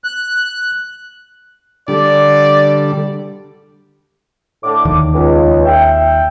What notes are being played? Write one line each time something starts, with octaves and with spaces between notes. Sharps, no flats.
F#6
D3 G3 D5
A2 D3 D6
D#2 D#3
C#2
E5 G5